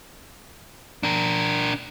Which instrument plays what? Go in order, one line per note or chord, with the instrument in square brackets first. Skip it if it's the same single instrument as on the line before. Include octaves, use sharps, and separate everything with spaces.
[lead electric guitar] D4 A#4